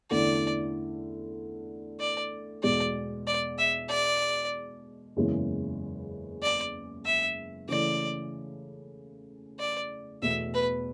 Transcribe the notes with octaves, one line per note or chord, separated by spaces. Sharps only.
E2 D3 A3 C#4 E4 D5
D5
E2 B2 G#3 D5
D5
E5
D5
F#1 E2 C#3 E3 G#3
D5
E5
C#3 E3 A3 D5
D5
E2 B2 A3 E5
B4